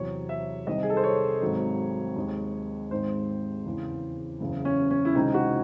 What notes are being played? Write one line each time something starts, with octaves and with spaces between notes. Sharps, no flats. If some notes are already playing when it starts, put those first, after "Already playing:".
Already playing: E2 C3 F#3 C#5
E5
C2 C3 D#3 D#5
G#4
A4
C5
C#5
G#1 G#2 D#3 F#3
D#2 D#3 G#3
G#1 G#2 D#3 G#3 C5
E2 C#3 E3
F#1 E2 C#3
C#4
C#4
E4
C#2 C3 D#3 D#4
F#4